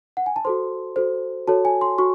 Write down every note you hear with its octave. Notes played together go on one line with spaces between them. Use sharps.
F#5
G#5
A5
F#4 A4 C5 C6
F#4 A4 C5
F#4 A4 C#5 A5
G#5
C6
F#4 C#6